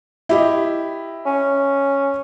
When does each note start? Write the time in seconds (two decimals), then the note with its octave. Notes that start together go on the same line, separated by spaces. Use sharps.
0.29 E4 G4 D#5
1.26 C#4